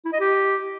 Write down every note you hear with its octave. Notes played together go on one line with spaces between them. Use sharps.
E4
D#5
G4